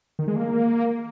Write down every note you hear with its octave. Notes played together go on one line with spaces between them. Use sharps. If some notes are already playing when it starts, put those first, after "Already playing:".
D#3
G#3
A#3